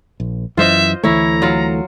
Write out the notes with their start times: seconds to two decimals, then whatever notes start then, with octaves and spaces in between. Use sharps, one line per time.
0.20 A#1
0.57 F#2 E3 F4 C5 D#5 E5
1.03 D2 E3 A3 E4 C#5 A#5
1.42 F#3 F4 F5